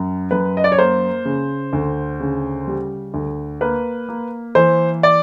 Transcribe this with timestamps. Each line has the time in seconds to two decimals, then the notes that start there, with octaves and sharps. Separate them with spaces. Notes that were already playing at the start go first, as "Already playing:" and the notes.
Already playing: F#2
0.31 F#2 B4
0.57 D#5
0.64 D5
0.72 C#5
0.78 A#3 C5
1.25 C#3
1.73 D2
2.20 C#3
2.67 G3
3.14 D2
3.61 A#3 B4
4.09 A#3
4.55 E3 C5
5.03 D5